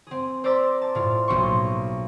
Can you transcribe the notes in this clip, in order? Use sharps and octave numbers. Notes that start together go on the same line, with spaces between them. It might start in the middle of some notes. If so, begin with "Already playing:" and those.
C4 G#4
C5 D5 A#5 D6 E6 B6
A5
A2 F4
B1 A#3 G4 C6 C#6